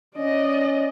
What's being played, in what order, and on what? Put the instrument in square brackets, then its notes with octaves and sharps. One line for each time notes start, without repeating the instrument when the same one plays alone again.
[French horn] C#4 [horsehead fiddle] D5 D#5